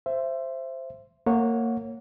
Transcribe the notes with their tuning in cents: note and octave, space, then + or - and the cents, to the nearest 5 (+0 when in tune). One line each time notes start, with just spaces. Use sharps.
C5 +0 E5 +25
A#3 -25 C#5 -10 F#5 -15